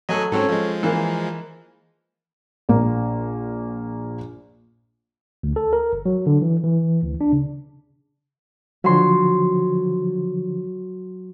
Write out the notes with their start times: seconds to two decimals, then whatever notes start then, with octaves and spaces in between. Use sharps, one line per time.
0.09 F#3 A3 A4 D#5 G#5 F#6
0.32 G#2 F#3 C4 C#4 A4
0.49 F3 G#3
0.83 E3 A#3
2.69 A#1 A#3
5.43 D2
5.56 A4
5.73 A#4
5.93 G1
6.06 F#3
6.27 D3
6.42 E3
6.64 E3
7.02 D2
7.21 D4
7.33 C#3
8.84 D3 F3 F#3 C6